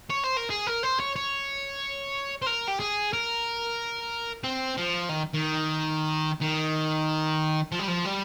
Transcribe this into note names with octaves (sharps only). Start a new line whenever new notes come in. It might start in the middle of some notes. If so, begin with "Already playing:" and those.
C#5
C5
A#4
G#4
A#4
C5
C#5
C#5
C5
A#4
G4
G#4
A#4
C4
F3
D#3
D#3
D#3
F3
G3
F3
G3